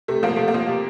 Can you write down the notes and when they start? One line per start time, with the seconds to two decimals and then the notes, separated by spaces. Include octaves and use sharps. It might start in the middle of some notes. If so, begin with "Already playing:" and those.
0.08 C3 A3
0.23 F3 A#3
0.36 C3 A3
0.48 A#3
0.54 F3
0.68 C3